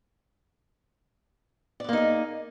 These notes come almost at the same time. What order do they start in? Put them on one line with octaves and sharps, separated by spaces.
D5 B3 A#3 D#4 G#4